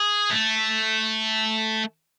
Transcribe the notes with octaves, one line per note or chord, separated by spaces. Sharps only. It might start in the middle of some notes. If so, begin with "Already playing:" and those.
Already playing: G#4
A3